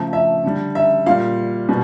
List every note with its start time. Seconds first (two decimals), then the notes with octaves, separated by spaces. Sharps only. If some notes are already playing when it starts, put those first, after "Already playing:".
Already playing: C#3 F3 A3
0.13 E5
0.44 D3 G3
0.75 E5
1.06 A#2 G3 F5
1.69 B2 G3